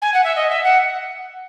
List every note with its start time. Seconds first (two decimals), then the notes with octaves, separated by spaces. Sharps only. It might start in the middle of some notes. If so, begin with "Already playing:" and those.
0.02 G#5
0.14 F#5
0.24 E5
0.36 D#5
0.49 E5
0.63 F#5